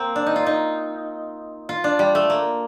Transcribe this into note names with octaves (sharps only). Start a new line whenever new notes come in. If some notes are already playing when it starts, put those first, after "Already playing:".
Already playing: A#3 C4
D4
D#4
F4
D#4
F4
D4
G3
A3
A#3